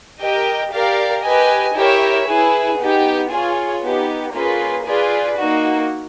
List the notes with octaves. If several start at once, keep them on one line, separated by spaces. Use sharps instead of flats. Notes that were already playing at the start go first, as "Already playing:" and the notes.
G4 A#4 D#5 G5
G4 A#4 D5 F5
G4 B4 D#5 G#5
E4 G4 A#4 C#5 E5
E4 G#4 B4
B3 D#4 G4
F4 G#4 C#5
B3 D#4 G4
A#3 C#4 F4 G#4 B4
F4 G#4 B4 D5
A#3 D#4 F#4